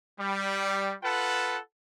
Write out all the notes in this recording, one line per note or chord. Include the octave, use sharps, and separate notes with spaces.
G3
F4 A4 B4 F#5 A5